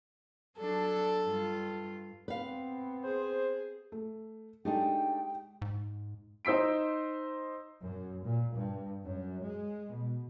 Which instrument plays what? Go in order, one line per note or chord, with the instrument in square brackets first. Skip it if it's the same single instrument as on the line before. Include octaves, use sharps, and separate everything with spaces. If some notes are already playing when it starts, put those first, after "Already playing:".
[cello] F#3 D4 [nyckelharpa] A4
[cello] G2 F4
[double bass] B3 C4 [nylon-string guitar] B4 F5
[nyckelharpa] G#4 [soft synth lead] C5
[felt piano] A3
[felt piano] G#3 G4 [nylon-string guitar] A3 D4 D#4 [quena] G5
[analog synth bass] G#2
[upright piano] D#4 C5 E6 B6 D7
[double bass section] F#2
A#2
G2
F#2
G#3
B2